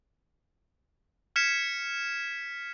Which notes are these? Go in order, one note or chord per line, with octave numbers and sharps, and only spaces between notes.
F6 G#6 B6 C#7 E7